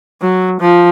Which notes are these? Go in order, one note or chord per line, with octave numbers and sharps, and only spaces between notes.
F#3
F3